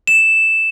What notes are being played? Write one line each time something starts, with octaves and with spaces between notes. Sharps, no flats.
E7